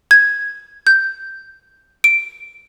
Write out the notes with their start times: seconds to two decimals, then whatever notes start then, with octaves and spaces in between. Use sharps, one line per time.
0.11 G#6
0.87 G6
2.04 D7